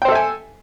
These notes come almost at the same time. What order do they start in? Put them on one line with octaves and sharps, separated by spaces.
G5 C5 A4 E5 G#5